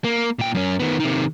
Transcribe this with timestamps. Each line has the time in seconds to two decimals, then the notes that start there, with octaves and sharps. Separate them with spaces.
0.04 A#3
0.39 A#2 G5
0.55 F#2 C#4
0.80 D#3 B3
1.00 C3 D#3